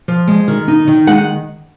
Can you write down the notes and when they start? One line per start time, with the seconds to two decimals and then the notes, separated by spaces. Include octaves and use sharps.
0.08 F3
0.28 G#3
0.48 D#3
0.68 D#4
0.88 D#3
1.07 G#3 F#5